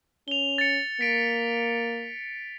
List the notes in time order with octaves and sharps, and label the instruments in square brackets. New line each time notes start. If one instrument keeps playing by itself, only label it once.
[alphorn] C#4 [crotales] F7 G7
[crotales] A6 C#7
[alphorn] A#3 [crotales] B6 D7